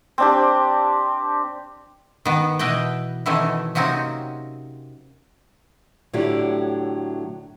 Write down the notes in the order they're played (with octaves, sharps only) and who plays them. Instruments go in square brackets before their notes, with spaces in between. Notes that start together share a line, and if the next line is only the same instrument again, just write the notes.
[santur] C4 D4 G4
[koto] D#3 B3
B2 E3 B4 D#5 G5
B2 D#3 E3 A3 C4 C#4
C3 F#3 A#3 C4 C#4 D#4
[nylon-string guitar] A2 D3 F#3 A3 E4 G4